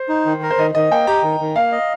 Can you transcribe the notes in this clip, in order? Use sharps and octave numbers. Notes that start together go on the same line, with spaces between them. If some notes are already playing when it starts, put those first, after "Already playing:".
Already playing: C5
D#4
D#3
A#4
C5
D#3 D#5
D#3 D#5
A#3 G5
G4 A#5
D#3
D#3
A#3 F5
D#5